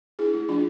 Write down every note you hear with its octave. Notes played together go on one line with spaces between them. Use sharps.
D4 E4 G#4
A3 E4
F3 D4 F4